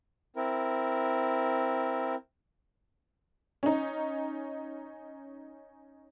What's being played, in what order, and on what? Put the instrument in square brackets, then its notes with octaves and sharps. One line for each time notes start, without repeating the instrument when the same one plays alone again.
[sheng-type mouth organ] C4 E4 A#4
[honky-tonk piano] C#4 D#4